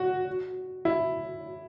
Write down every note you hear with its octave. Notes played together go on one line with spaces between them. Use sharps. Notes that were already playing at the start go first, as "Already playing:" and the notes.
Already playing: F#4
E4